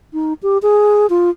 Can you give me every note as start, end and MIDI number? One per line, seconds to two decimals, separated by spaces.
0.13 0.33 63
0.43 0.58 67
0.62 1.07 68
1.10 1.30 65